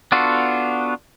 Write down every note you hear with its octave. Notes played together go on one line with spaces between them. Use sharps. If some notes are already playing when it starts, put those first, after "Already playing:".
B3 D4 F4 F#4 A4